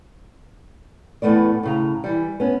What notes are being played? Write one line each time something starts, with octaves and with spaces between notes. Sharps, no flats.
E2 A2 A3 B3 D5
A2 C#3 A#5
E3 G3
B3 C#4